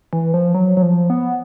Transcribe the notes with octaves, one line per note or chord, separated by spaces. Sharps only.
E3
F3
F#3
F#3
F3
B3